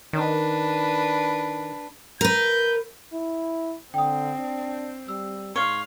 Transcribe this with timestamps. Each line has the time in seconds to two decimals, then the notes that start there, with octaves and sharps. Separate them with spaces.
0.13 D#3 D4 B4
2.21 A#4 B4 G6
3.13 E4
3.94 D3 C4 G5 D#6
4.38 D4
5.08 G3 E6
5.56 G#2 C#5 F5 C6 F6 G7